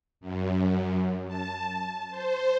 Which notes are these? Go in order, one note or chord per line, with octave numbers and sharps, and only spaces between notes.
F#2
A5
C5